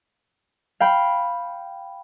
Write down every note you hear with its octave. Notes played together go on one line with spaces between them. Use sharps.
F5 G5 B5